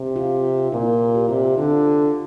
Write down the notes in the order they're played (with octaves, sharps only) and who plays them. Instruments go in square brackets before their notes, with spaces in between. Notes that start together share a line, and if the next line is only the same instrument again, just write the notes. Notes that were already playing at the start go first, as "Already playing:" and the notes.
Already playing: [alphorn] C3
[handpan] F4
[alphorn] A#2 [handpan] E4
[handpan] G4
[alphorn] C3 [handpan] F4
[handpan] F4
[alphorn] D3 [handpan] F4